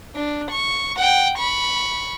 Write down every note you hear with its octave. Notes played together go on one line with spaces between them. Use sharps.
D4
C#6
F#5 G5
B5 C#6